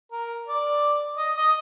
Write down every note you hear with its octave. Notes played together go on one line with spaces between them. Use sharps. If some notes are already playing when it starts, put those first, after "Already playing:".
A#4
D5
D#5
D#5